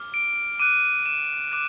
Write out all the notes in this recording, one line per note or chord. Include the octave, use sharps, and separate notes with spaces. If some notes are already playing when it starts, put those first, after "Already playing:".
Already playing: D6 F6
D7
D6 F#6 D#7
E7
D6 F#6 E7